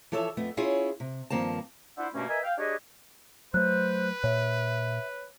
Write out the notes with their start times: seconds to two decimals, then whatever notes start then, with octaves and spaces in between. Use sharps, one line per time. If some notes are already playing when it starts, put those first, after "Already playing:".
0.12 E3 F3 A4 C#5 E5
0.37 F2 A3 B3
0.57 C#4 E4 F4 G#4 C#5
1.00 C3
1.30 G2 D#3 F3 A#3 C4 A5
1.97 D4 E4 F4 C5 E5 F#5
2.13 G2 B2 A3 A#3 C#4
2.28 A#4 B4 D#5 E5 G#5
2.43 F5 G5
2.58 D4 G4 G#4 B4 C#5 D#5
3.54 F#3 A3 B4 C5 F#6
4.24 A#2 C#5 E5